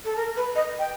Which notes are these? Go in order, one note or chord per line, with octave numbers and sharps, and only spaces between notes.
A4
A#4
B4
D#5
G5